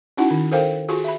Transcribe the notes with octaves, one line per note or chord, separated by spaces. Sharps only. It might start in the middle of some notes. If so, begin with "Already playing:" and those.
C#4 D#4 E4 F#4 F#5
D#3
A4 A#4 C5 F5 G5
F4 F#4 G#4 G#5
E5 B5